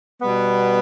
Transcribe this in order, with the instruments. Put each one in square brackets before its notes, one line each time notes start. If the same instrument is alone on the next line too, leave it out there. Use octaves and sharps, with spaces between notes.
[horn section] B2 G3 B3